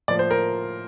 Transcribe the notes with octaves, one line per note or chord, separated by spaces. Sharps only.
A2 F3 A#3 D5
C5
A#4